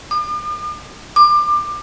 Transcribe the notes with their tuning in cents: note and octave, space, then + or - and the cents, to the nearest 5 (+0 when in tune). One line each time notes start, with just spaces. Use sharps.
D6 +45
D6 +25